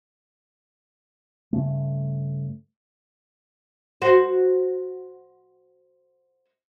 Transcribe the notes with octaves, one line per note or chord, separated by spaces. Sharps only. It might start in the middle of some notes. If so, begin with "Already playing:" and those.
G2 C#3 A3
F#4 C5